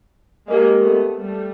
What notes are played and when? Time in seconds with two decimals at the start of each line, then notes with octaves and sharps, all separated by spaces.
0.48 G#3 A#3 G4 A#4 D#5
0.82 A3 B3
1.17 G3 A3